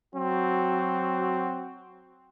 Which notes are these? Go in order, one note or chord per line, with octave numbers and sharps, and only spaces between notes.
F#3 C4 F#4